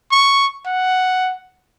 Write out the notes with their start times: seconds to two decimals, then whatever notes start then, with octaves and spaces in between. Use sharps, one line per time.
0.12 C#6
0.66 F#5